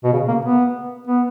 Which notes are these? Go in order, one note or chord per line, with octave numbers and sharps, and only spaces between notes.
B2
C#3
A#3
B3
B3